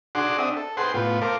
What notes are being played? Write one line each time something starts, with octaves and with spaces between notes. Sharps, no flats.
D4 F#4 G#4 F#5 C6 D6
C4 D4 E5 D#6
A4
G#4 B4 C5 F#5 G5 C6
A2 B3 F4 B4
A4 A#4 C5 F5 D6